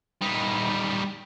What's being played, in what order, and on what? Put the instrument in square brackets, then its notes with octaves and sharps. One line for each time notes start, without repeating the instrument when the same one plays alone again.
[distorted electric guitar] G3 D#4